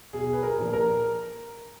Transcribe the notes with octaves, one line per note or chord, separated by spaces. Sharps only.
B1 G#4
B4
A#4
A#2 F3
A#4